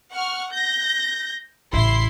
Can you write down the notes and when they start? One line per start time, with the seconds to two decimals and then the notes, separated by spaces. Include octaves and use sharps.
0.11 F#5 C#6 F6
0.51 G6 A#6
1.73 A1 C#3 E4 C6 C7